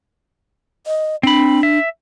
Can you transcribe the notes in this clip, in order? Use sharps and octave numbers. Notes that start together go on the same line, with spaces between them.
D#5
C4 D4 B5
E5